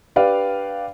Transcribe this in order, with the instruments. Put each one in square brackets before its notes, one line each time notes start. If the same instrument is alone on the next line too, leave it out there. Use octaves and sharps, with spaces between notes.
[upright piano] D4 G4 B4 D5 F5